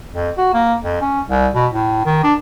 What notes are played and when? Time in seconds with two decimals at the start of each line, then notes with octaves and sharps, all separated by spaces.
0.14 F2
0.38 F#4
0.54 A#3
0.84 F2
1.01 C#4
1.30 C2
1.55 B2
1.73 A2
2.06 D#3
2.24 D4